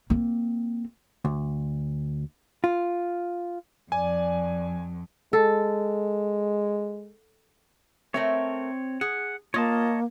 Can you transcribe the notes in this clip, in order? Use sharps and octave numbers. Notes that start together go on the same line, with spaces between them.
A#3 C4
D2
F4
F2 D5 G#5
G#3 A4
A3 C4 A#4 C#5 E5
G#4 F#5
A#3 F4 C#5 D#5 A5